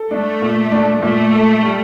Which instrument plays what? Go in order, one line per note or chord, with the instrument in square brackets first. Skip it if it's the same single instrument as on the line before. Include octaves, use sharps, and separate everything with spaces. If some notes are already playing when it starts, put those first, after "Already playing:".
Already playing: [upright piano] A4
[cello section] A3 [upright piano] D4
[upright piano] A#2
D4
[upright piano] A#2 [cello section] A3
[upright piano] A4
G3